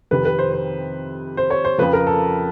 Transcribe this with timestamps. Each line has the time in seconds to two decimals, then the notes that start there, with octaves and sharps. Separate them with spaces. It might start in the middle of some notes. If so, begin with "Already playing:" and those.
0.11 F2 C3 D#3 B4
0.25 B4
0.39 C5
0.53 C5
1.37 C5
1.50 C#5
1.65 C5
1.78 F2 C#3 F3 B4
1.93 A#4
2.07 A4